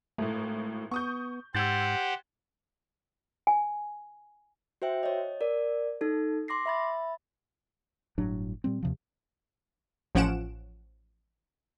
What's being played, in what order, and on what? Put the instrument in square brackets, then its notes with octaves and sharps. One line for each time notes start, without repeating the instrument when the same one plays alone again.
[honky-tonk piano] G#1 A2 [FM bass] A3
[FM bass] B3 [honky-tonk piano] C#6 D#6 G6
[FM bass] G#2 [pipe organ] G4 C5 F#5 [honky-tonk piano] E6 G#6 A6
[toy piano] G#5
[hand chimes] F#4 C5 E5 G5
C#5 D#5
A#4 D5
D#4 A4
C6 D6 A#6 C7
E5 B5 A6
[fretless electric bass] G1 A2 F#3 D4
A#2 G3 C4
D#2 C3 F3
[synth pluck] A1 F3 C#4 F#5 D7 E7